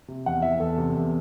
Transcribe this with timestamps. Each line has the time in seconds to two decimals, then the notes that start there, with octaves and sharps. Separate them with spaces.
0.08 C3
0.26 E2 F#5
0.42 E3 E5
0.60 E2 A4
0.78 C3
0.95 E2